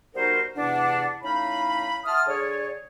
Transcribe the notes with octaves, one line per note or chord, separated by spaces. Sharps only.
G3 B3 D#4 F#4 A#4 C5
E2 C3 D4 F#5
A2 C#4 D#4 F5 B5
E5 F#5 A5 C6 D#6 F6
D3 G#4 C#5 D5